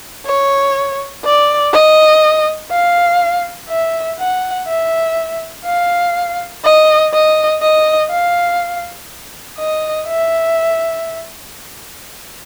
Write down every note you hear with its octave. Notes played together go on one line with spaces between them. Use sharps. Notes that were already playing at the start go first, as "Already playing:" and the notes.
C#5
D5
D#5
F5
E5
F#5
E5
F5
D#5
D#5
D#5
F5
D#5
E5